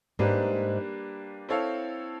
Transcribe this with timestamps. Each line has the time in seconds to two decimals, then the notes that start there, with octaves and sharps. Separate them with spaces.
0.19 G#2 G3 A#3 D4 G4 B4
1.49 C4 E4 A4 C#5 F5